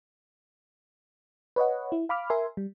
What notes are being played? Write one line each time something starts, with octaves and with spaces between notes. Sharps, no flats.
B4 C#5 D#5 F#5
E4
F5 B5 D6 F6
A#4 E5 G#5 C6
G3